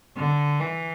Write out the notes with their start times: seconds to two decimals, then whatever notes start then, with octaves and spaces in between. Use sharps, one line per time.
0.17 D3
0.60 E3